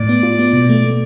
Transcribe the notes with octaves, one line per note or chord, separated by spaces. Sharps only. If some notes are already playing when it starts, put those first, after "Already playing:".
Already playing: A2 D5
B3
F4
B3
B2
A3
A3